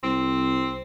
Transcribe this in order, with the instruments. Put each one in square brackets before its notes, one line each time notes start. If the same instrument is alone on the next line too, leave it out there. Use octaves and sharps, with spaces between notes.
[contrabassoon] C2 [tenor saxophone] C4